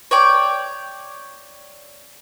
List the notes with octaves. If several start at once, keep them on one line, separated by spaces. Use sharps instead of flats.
C#5 D5 G5